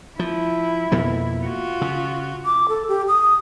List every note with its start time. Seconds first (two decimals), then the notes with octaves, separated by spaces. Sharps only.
0.19 F3 E4
0.92 F2 B2 A#3
1.42 F4 F#4
1.81 C#3
2.45 D6
2.69 A4
2.88 G4
3.08 D#6